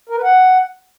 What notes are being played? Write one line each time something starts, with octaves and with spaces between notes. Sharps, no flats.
A#4
B4
F#5